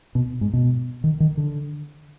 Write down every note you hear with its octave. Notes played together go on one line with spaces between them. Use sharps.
B2
G#2
B2
D#3
D#3
D3